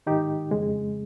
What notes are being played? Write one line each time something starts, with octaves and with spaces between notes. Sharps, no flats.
G#2 D#3 D#4 G4
F2 C#3 G#3